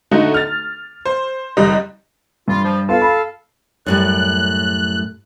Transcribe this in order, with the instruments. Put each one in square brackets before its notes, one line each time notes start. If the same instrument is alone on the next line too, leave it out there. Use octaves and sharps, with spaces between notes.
[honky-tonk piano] D3 A3 D#4 F#4
F6 A6
C5
F#1 G3 D#5
[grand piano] G2 [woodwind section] F4
[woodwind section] F3
[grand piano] B3 F4 [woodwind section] A4 F5 A5
[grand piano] B5
[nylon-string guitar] F#2 A2 G3 [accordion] F#6